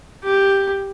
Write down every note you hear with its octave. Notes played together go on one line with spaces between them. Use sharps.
G4